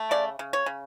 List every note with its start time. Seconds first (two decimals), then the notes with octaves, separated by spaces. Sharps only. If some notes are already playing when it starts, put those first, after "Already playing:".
Already playing: A3
0.11 C#3 D5
0.39 C#3
0.53 C#5
0.66 C#3